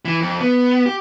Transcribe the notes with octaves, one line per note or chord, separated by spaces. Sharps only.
E3
F2
B3
G4